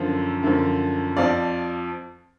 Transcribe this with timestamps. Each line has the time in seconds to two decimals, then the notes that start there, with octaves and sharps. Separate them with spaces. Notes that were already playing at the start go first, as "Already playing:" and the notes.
Already playing: F#2 D3 F3
0.43 F#2 D3 F3
1.17 F2 F3 D5 F5